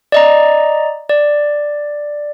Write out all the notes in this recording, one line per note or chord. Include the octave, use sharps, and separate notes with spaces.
D5 D#5 A#5
D5